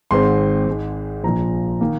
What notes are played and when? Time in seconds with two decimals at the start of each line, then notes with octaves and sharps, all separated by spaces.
0.11 G#1 G#2 D#3 C4 C6
0.67 G#1 G#2 G#3
1.24 A#1 A#2 F3 A#5
1.81 D#3 A#3